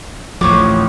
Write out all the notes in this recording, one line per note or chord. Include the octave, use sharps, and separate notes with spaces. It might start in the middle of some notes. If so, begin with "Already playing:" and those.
A1 D2 F3 C5 C#5 D6